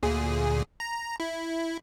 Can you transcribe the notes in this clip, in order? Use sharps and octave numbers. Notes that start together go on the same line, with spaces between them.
D2 A#2 G#4
A#5
E4